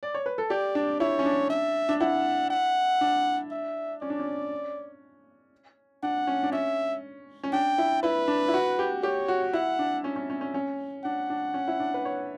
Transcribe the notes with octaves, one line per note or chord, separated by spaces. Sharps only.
D5
C#5
B4
A4
G4 D5
D4
E4 C#5
C#4
D4
E5
D4
E4 F#5
F#5
D4
E5
C#4 D5
D4
C#4
D4 F#5
C#4
D4
C#4 E5
C#4
D4 G5
E4
E4 B4
D4
E4
F#4
G4
G4 C#5
F#4
E4 F#5
D4
C#4
C#4
C#4
C#4
C#4
D4 F#5
D4
C#4
E4
D4
B4
C#5